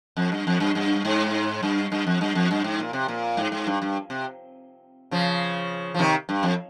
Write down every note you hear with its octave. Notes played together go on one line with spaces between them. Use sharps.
F2
G2
F2
G2
G2
G#2
G2
G2
F2
G2
F2
G2
G#2
A#2
C3
A#2
G#2
G#2
G2
G2
C3
C#3 F3
F3
C3 D#3
G2
F2